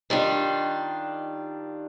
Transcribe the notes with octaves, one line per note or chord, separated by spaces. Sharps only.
D#3 G3 D4 F4